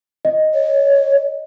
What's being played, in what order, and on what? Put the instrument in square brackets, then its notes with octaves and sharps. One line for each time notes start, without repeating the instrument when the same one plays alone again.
[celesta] D#5
[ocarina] C#5